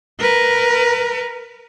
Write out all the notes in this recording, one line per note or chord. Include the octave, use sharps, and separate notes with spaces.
A#4 B4